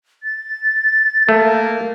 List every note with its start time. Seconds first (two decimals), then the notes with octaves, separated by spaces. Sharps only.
0.23 A6
1.29 A3 A#3